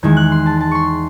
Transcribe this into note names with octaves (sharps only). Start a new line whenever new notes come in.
E2 D#3 G#3 G#6
F#6
C6
A5
A5
C6 C#6